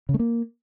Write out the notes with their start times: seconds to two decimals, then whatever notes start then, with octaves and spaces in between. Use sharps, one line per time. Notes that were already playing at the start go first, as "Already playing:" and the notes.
0.09 C#3
0.14 A3
0.19 A#3